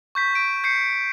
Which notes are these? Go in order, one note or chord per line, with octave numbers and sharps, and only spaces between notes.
C#6 G6 B6
D7
G6 C7 C#7